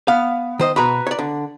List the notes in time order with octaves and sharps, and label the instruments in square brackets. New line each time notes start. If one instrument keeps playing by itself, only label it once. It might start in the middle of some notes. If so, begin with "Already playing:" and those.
[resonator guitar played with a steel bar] B3 [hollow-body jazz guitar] F5
[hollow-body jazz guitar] D#3 C5 D#5
[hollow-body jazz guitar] B2 B5 [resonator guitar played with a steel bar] F#4 B4 A#5
[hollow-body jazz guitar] C#5 D5
D3